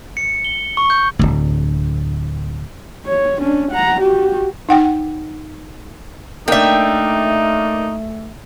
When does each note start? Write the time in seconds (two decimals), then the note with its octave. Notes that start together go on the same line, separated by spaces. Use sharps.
0.17 C#7
0.45 G7
0.77 C#6
0.90 G6
1.19 D1 G#1 D2
3.06 C#5
3.40 C#4 D4
3.71 F#5 A#5
4.00 F#4 G4
4.69 D#4 F#5 G5
6.48 A3 A#3 D4 D#4 E5 G5